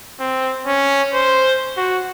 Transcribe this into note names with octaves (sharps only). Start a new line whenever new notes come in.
C4
C#4
C5
F#4